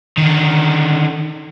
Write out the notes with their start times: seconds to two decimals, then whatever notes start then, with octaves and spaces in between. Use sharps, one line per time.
0.17 D3 D#3